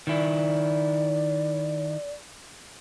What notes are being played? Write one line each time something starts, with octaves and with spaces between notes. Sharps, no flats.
D#3 E4 D5